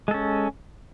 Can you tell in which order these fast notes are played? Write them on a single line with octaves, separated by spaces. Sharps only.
G#3 A4 C#4